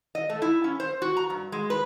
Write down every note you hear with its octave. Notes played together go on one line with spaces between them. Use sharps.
D#5
A3
E4
C#4
C5
F#4
A#5
G2
G#3
B4